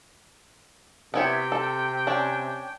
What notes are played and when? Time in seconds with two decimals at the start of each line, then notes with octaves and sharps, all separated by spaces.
1.14 C3 B3 E4 C#5 G5
1.52 A4
2.07 C#4 D4